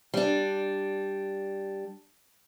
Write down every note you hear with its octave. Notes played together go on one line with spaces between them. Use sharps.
G3 D4